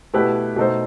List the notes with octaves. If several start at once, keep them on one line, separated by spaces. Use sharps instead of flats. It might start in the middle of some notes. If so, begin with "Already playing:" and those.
B2 A3 E4 G4 B4
B2 A3 D#4 A4 C5